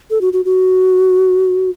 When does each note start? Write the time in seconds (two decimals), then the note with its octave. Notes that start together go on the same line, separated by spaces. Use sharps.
0.10 A4
0.21 F#4
0.33 F#4
0.45 F#4